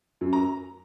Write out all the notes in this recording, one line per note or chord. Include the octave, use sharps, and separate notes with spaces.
F#2
A#5